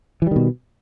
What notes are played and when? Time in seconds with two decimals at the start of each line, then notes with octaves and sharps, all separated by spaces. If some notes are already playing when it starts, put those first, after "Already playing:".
0.22 E3
0.27 G3
0.31 D#3
0.36 B2